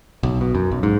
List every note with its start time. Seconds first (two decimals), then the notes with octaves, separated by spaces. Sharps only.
0.23 B1
0.41 B2
0.55 F#2
0.71 B1
0.83 G#2